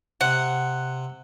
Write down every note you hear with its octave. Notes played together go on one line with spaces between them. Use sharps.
C3 F#5